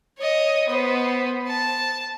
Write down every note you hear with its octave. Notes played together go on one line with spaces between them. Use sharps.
C#5 D#5
B3 C5
A5